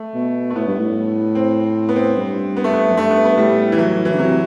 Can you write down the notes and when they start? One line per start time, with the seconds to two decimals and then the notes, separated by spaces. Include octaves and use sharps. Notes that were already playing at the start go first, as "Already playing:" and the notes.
Already playing: A3
0.14 B2
0.50 A3
0.56 A2 B3
0.67 G2
0.79 A2
1.35 C4
1.89 B3
1.96 C4
2.16 G2
2.57 B3
2.64 A3
2.73 B3
2.90 F#2
2.97 G2 A3
3.10 B3
3.25 B3
3.38 A2 G3
3.72 E3
3.78 F#3
4.05 E3
4.14 D3
4.19 C3 F#3